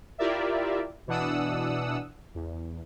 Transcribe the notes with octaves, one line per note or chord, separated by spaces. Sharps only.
E4 F4 G4 A#4 D5 E5
B2 E3 D4 F#5 D#6 E6
E2